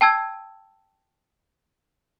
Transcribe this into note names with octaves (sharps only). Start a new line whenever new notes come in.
G5 A5 E6 G#6